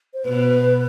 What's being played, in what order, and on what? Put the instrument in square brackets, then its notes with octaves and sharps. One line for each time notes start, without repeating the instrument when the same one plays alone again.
[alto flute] C5
[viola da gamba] B2 [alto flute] B4